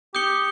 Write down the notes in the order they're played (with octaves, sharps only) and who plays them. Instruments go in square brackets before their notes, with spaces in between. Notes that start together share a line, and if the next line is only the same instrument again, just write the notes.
[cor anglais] G4 [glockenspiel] D#6 G6 C#7 G7